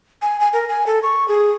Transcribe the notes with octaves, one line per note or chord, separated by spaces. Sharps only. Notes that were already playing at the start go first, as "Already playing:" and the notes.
G#5
G#5
A#4
G#5
A4
C#6
G#4